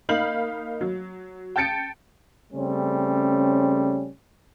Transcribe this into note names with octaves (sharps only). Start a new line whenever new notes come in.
A#3 D#4 F5 B5 G6 F#7
F#3
G5 A5 G6 A6 C#7 D7
C#3 G3 A3 C4 C#4